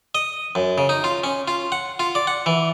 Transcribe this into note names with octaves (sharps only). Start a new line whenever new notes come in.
D#5
F#2
C#3
D#4
F4
C#4
F4
F#5
F4
D5
F#5
E3